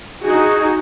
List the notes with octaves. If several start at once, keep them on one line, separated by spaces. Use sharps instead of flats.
D#4 F#4 G#4